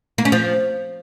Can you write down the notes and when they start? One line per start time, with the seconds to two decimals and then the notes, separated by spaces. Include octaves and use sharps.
0.18 A#3
0.25 C#4
0.32 F3